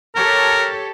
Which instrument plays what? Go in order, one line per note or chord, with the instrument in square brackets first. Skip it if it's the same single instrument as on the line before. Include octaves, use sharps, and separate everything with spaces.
[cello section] G4 A4 C#5 [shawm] A#4